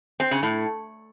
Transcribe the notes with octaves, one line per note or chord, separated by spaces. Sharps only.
C4
C#3
A2